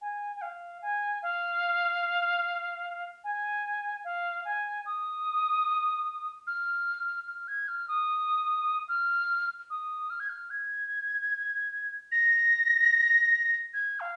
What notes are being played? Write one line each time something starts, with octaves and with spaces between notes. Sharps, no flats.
G#5
G#5
F5
G#5
F5
G#5
F5
G#5
D#6
F6
F6
G#6
F6
D#6
F6
D#6
F6
G#6
F6
G#6
A#6
G#6
F5